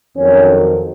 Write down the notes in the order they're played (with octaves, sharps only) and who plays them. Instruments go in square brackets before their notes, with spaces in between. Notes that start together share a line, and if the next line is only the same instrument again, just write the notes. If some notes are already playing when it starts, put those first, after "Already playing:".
[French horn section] F2 D#3 F#3 C#4